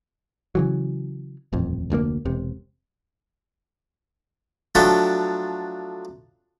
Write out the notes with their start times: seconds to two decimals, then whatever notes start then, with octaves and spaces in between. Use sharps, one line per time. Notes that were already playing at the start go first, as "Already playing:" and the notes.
0.55 C#3 E3 F#3
1.53 D#1 A1 F2
1.90 F1 D2 B2 A#3
2.25 E1 C3
4.75 F3 F#3 A3 D4 G5 C#6